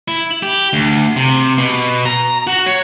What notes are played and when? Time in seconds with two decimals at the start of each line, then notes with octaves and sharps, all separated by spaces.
0.08 E4
0.43 G4
0.73 D2
1.17 C3
1.58 B2
2.05 A#5
2.47 F#4
2.66 C#5